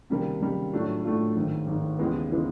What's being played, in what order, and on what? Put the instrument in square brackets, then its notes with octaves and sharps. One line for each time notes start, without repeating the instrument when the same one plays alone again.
[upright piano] C#2 C3 D#3 G3 A#3
C#2 C3 D#3 G3 A#3
A2 F#3 A3 D4 F4
A2 F#3 A3 D4 F4
G#1 G#2 D#3
G#1 G#2 D#3
D#2 C#3 E3 G#3 B3
C#3 E3 G#3 B3